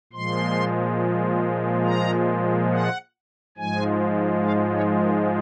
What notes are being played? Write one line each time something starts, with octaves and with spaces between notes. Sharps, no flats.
A#2 F3 G#3 C6
A#5
F#5
G#2 F3 G#3 G#5
F5
C#5
A#4